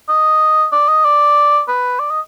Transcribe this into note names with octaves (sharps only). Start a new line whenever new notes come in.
D#5
D5
D#5
D5
B4
D5
D#5